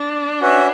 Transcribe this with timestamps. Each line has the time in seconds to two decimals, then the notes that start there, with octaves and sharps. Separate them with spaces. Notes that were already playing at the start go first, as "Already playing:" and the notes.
Already playing: D4
0.41 C#4 F#4 B4 E5